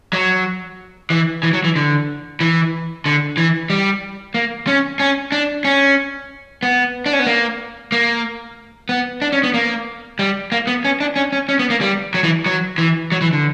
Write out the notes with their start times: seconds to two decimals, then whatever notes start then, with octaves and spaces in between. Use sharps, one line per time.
0.13 F#3
1.10 E3
1.43 E3
1.53 F#3
1.64 E3
1.76 D3
2.40 E3
3.06 D3
3.37 E3
3.70 G3
4.34 A#3
4.67 C#4
5.00 C#4
5.32 D4
5.65 C#4
6.63 B3
7.06 D4
7.13 C#4
7.19 B3
7.26 A#3
7.92 A#3
8.89 B3
9.22 D4
9.32 C#4
9.43 B3
9.54 A#3
10.19 G3
10.52 A#3
10.67 B3
10.85 C#4
11.00 D4
11.16 C#4
11.33 C#4
11.49 C#4
11.59 B3
11.70 A#3
11.81 G3
12.14 F#3
12.24 E3
12.46 F#3
12.78 E3
13.12 F#3
13.21 E3
13.33 D3